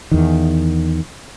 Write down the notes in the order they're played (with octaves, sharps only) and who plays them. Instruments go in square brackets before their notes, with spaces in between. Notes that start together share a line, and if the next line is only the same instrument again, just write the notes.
[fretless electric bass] E2 D#3